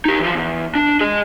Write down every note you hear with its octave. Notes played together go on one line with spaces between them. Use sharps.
D#4 G4
E3 F3
E2
D4
G#4 D#5